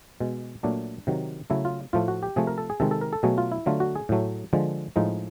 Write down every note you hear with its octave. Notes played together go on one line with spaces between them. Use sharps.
B2 G#3
A#2 F#3 A3 D4
C3 D#3 F#3
C#3 F#3 A3 E4
F4
A2 F3 A3 F4
F#4
G4
C3 F3 A3 G#4
A#4
A4
G#4
C3 D#3 G#3 A4
A4
A#4
A4
B2 F#3 A3 G#4
F4
E4
D3 F#3 A3 F4
F#4
G#4
A2 F#3 A3
D3 F3 G#3
A2 F3 G#3 D#4